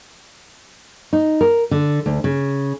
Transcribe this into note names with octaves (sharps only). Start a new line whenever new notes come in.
D#4
A#4
D3
D2
C#3